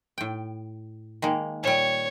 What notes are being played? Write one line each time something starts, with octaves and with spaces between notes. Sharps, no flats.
A2 G5
D#3 G#3 A#3
A#2 G3 C#5